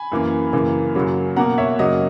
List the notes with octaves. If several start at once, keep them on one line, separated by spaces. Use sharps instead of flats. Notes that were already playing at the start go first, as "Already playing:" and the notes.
Already playing: G#5 B5
F#2 E3 A#3
F#2 C#3 E3 A#3
F#2 C#3 F#3 A#3
B2 A#3 F#5 A#5
C#5 E5
F#2 C#3 F#3 A#3 D#5